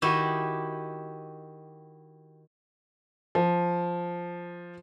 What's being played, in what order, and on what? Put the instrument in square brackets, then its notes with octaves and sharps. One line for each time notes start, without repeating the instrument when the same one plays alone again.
[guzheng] D#3 E4 F#4 G4 D#5
[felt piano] F3